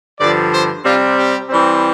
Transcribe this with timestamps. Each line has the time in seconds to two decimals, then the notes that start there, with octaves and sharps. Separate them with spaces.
0.19 G2 D3 F3 D5
0.51 C5
0.84 C3 G3 C4 F4
1.17 G4
1.49 E3 G3 C4